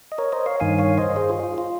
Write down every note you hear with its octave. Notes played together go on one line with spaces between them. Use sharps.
D#5
A#4 C#5
C5 D#5
C#5 F5
G2 D#3 F5 G#5
C#5 F5
C5 D#5
G#4 C5
F4
F4
F4